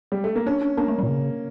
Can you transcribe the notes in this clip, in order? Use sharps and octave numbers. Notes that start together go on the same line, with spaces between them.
G3
A3
A#3
C#4 D4
D4
A#3 D4
A3
G3
A#2
C#3